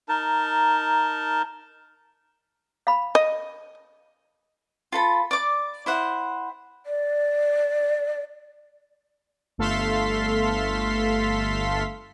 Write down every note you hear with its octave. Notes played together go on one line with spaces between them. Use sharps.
D#4 A#4 A5
F5 B5
D#5
F4 A4 B5
D5 D6
E4 C5 F#5
D5
G1 A3 A4 F5 C6 B6